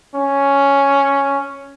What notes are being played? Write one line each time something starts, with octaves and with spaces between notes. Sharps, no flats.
C#4